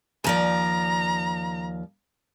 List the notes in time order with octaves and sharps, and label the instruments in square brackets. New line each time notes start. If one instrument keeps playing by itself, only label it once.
[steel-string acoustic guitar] D#2 F3 D5 [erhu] A#5